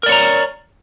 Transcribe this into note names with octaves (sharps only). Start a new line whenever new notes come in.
A#4 C#5 D5 A#5